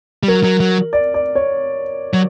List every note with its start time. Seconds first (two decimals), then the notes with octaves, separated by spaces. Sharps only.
0.23 G3
0.28 F#3 A#4
0.44 F#3
0.60 F#3
0.93 D5
1.14 D5
1.36 C#5
2.14 F#3